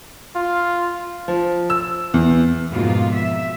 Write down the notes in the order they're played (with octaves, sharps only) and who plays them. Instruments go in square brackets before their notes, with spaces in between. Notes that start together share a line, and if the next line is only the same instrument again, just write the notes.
[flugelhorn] F4
[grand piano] F3
E6
E2
[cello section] F2 G#2 B2 A#3 F4
E5